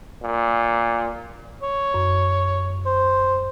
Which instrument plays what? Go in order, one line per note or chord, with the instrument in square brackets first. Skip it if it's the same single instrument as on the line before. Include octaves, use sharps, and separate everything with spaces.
[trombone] A#2
[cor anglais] C#5
[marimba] F#2
[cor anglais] C5